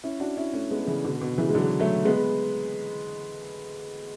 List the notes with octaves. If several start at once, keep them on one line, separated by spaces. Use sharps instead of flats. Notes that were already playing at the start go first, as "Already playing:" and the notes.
C#4 E4
D4 F#4
C#4 E4
A3 C#4
G#3 B3
C#3 E3
B2 D3
B2
C#3 E3
G#3
D3 F#3
F#3 A3
G#3 B3